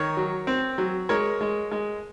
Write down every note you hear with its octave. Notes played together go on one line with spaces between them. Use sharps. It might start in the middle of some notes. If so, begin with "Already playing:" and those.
Already playing: D#3 A#4 C#5
F#3
C4
F#3
G#3 A#4 C#5
G#3
G#3